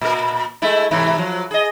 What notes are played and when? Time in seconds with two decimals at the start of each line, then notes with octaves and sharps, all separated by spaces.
0.01 A#2 A#4
0.62 G#3 A3 E4
0.91 G#2 C3 E3
1.18 F3 F#3
1.51 G#4 D#5